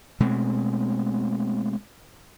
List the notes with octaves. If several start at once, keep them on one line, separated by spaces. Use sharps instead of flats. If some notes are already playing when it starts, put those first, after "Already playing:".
B2 G#3 A3 C4